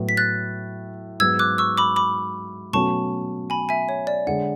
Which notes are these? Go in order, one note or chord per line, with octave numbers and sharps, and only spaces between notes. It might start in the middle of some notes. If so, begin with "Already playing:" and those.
Already playing: A2 F#3 B3
B6
F#6 A6
G#2 F#3 B3 F#4 E6 G#6
D6 F#6
C#6 E6
B5 D6
B5 D6
B2 F#3 A3 C#4 F#4 A5 C#6
G#5 B5
E5 G#5
C#5
D5
D3 G#3 D4 F#5